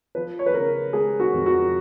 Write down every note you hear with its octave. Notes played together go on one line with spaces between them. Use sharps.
F3 B4
C#5
B4
C#3 A#4
G#3 G#4
F#4
F2
F#4